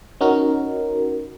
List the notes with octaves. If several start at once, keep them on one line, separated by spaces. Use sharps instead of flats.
C#4 D#4 F#4 A#4